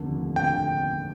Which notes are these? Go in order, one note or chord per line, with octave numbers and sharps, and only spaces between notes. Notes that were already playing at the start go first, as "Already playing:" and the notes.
Already playing: F1 D#2 D3
D3 G5